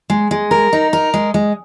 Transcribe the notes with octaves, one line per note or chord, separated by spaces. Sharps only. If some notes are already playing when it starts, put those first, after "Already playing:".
G#3
G#3
A#4
D#4
A#4
G#3
G#3